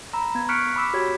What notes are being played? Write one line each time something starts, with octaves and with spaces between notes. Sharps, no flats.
A#5 B5 E6
B3 G#6
C#6 F6 F#6 B6 C#7 D7
B5 D6 E6 B6
F#4 G4 C#5 G#6